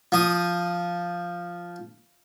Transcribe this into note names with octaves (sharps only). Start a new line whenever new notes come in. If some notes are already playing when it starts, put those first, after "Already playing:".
F3 D#6